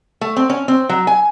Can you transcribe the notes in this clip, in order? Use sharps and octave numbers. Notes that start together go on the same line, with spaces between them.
A3
C4
C#4
C4
F#3
G#5